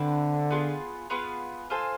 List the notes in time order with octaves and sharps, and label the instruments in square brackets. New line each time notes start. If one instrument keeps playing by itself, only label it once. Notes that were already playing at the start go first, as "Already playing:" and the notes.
Already playing: [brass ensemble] D3 [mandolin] C4 E4 B4
[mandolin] B3 F4 G#4 B4
B3 F4 G#4 B4
F4 A4 C5 G#5